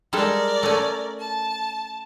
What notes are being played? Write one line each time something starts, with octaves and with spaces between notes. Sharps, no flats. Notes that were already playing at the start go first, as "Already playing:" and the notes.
G3 G#3 A4 A#4 D5
A3 C#4
A5